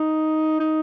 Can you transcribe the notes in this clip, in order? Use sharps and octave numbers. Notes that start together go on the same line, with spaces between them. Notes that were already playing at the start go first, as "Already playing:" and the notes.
Already playing: D#4
D#4